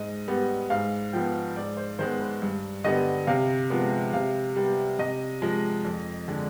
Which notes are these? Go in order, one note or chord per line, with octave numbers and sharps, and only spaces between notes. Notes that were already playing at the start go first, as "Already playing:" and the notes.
Already playing: G#2 D#5
G3 B3
G#2 F5
F3 B3 G5
G#2 D5
C5
D#3 G#3 B3 C5
B4
G2
D3 G3 B3 D#5
C3 F5
F3 G#3 B3
C3 F5
G3 B3
C3 D#5
F3 G#3
F2
D3 G#3